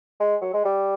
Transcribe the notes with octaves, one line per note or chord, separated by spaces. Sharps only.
G#3
F#3
G#3
G3